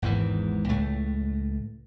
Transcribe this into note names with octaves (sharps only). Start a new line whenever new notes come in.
G#1 E2 G#2 E3
C#2 A2 A3